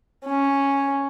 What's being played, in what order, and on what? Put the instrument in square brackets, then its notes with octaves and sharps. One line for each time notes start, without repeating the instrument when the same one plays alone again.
[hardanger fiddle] C#4